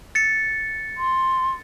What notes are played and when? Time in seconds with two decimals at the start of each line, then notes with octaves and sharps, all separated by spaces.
0.15 A6 C#7
0.97 C6